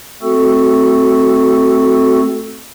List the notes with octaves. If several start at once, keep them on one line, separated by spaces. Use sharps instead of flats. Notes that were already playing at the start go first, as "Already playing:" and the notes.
A3 C4 F#4 A4